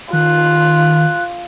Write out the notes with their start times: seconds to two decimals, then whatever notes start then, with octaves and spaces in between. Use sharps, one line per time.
0.13 D#3 F4 F#6